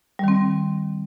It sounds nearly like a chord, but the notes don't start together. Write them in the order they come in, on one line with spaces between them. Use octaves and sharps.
G3 D#3 C4